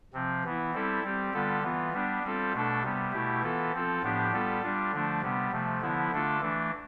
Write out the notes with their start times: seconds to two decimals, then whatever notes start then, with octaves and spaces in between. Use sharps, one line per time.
0.13 C3 F3 C4
0.44 E3 B3 E4
0.74 G3 C4 E4 A4
1.03 G3 C4 G4
1.34 D3 G3 B3 F4 A4
1.63 E3 B3 F4
1.93 G3 B3 D4
2.23 G3 C4 F4 A4
2.53 B2 A3 D4 A4
2.83 C3 G3 B3
3.12 B2 A3 E4 G4
3.42 E3 B3 F4 A4
3.72 F3 C4 F4 A4
4.02 A2 F3 B3 D4 G4
4.32 G3 B3 F4 A4
4.62 G3 D4 F4
4.92 D3 F3 A3 D4
5.22 C3 G3 B3
5.51 C3 F3 A3
5.81 D3 F3 B3 E4
6.11 D3 A3 D4 F4 A4
6.41 E3 A3 D4